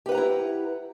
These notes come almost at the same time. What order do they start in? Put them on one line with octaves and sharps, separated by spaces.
G4 B4 F#5 A#5 E4